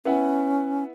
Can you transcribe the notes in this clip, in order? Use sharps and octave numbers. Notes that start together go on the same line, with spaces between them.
B3 C#4 E4 F#5